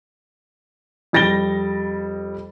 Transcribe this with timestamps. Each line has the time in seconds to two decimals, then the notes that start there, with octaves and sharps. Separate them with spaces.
1.13 F2 G3 A6 A#6 D7 G7